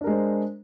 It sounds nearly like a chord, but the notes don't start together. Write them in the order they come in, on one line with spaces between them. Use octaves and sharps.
D4 A#4 G#3 C5